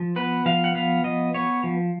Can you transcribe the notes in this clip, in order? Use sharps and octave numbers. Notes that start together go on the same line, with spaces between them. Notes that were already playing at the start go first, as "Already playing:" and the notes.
Already playing: F3
B3 B4
F3 F5
F#5
B3 F5
F3 D#5
B3 C#5
F3